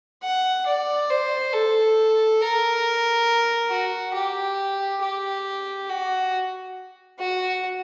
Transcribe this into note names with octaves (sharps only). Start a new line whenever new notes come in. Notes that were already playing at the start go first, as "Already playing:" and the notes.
F#5
D5
C5
A4
A#4
F#4
G4
G4
F#4
F#4